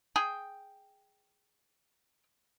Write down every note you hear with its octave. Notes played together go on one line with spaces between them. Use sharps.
G#4 G5